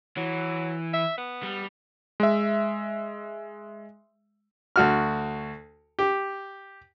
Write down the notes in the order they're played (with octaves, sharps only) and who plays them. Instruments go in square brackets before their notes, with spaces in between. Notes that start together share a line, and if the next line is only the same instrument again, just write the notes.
[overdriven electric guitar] E3 [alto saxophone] F#3
[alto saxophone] E5
B3
[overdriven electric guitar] G3
[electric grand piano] G#3 E5
[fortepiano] D2 F#4 F6
G4